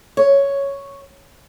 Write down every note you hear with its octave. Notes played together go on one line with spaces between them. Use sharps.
C#5